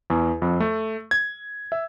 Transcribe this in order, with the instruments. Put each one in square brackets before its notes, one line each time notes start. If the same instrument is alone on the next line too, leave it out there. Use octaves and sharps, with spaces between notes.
[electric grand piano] E2
F2
A3
G#6
E5